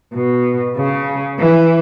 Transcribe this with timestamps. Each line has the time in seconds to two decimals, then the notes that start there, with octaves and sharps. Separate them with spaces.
0.14 B2
0.76 C#3
1.39 E3